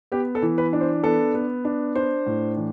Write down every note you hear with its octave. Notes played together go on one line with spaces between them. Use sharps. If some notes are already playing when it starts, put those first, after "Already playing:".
B3 G4
A4
E3
B4
D4
C5
B3 A4
B3
D4
D4 C5
A2
E3